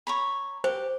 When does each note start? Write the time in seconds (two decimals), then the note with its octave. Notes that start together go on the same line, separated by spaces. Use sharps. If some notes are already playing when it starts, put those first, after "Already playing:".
0.07 C#5 A#5 B5
0.64 G4 C5